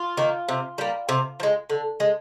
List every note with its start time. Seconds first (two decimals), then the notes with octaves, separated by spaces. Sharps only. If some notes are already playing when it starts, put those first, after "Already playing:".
Already playing: F4
0.17 D#3 A#3
0.49 C3
0.78 G3 A#3
1.09 C3
1.40 F3
1.43 G#3
1.70 D3
2.00 G#3